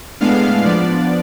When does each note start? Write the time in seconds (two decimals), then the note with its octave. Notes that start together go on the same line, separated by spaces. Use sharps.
0.21 A2 G#3 B3 D4 F5
0.65 F3 B3 D4 D5